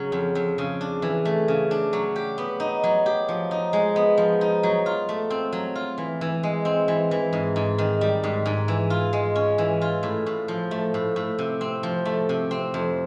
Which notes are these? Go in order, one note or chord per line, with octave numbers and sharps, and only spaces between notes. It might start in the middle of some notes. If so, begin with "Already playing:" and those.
Already playing: C#3 F#3
F2
F2
C#3
D4
E3
A3
C#3
D4
F#3
G4
B3
D#4
F#3
G4
F3
D#4
G#3
B3
F3
D#4
F#3
F4
A3
C4
F#3
F4
E3
E3
G#3
C4
E3
E3
G#2
G#2
D#3
G3
G#2
G#2
E3
F4
G#3
C#4
E3
F4
A2
A2
F3
A3
A2
A2
C3
C4
F3
A3
C3
C4
F2